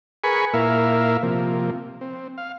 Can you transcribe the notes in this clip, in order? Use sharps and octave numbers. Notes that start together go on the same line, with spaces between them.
G#4 A#4 B4 G#5 B5 C#6
A#2 A#3 E4 A#4 E5 F5
C3 F3 A#3
C4
F5